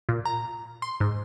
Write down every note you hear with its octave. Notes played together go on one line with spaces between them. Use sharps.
A#2
A#5
C6
G#2